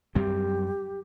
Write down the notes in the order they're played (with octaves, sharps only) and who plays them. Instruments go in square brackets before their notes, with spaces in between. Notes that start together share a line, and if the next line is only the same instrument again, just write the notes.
[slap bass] F#2 G3 C4 [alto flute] G4